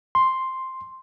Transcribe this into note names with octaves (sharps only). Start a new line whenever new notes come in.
C6